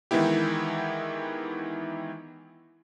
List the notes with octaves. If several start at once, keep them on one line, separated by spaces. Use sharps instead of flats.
D#3 E3 G#3 B3 E4 G4